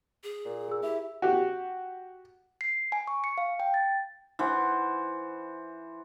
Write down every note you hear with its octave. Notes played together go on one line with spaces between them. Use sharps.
G#4
A#2
G#4 E6
E4 G4
F#4 G4
C7
G#5
C#6
C#7
F5
G5
A6
E3 C5 F#5